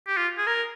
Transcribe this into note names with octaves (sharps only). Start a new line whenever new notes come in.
G4
F4
G#4
A#4